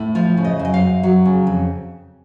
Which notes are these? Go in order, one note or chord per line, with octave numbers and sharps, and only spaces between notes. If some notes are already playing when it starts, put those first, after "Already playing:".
Already playing: A2
F3 F4
C#3
D#5
F#2
D#5
F5
F#2
F#3
C#3
F2